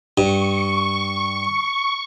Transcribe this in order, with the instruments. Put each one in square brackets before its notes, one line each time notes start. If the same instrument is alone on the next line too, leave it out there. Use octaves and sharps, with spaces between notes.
[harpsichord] G2 [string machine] C#6